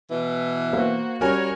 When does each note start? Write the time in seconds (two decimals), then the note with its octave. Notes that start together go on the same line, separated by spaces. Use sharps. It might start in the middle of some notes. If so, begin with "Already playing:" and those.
0.10 B2 E3
0.73 A#3 F#4 C5
1.21 G3 C#4 F#4 A#4 C#5 G#5 F6